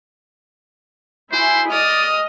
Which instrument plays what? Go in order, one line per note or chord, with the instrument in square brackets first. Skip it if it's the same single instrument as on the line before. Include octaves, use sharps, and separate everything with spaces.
[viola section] E4 [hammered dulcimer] F#4 G#4 [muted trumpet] C5
[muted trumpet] D5 [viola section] D#5 [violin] D#6 F6